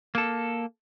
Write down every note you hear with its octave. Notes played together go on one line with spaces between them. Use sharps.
A#3 A4